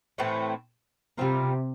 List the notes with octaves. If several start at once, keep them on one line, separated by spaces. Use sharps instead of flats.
A2 E3 A3 C4
C3 G3 C4 F4 A#4